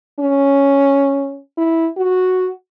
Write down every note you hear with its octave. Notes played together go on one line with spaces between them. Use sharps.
C#4
E4
F#4